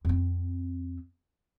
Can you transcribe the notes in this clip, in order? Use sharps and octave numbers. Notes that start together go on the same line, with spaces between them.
F2 C4